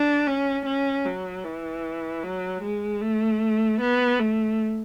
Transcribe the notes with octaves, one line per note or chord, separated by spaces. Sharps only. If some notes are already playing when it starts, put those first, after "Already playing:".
Already playing: D4
C#4
C#4
F#3
E3
F#3
G#3
A3
B3
A3